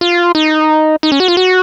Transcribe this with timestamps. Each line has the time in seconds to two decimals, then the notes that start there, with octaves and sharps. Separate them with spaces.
0.01 F4
0.35 D#4
1.03 D#4
1.12 C#4
1.20 F#4
1.28 F4
1.37 F#4